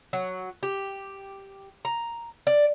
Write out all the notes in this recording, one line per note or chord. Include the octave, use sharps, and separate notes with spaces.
F#3
G4
A#5
D5